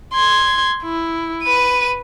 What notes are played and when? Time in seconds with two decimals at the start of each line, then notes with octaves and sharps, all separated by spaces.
0.14 C6 G#6
0.84 E4
1.43 B4 D#7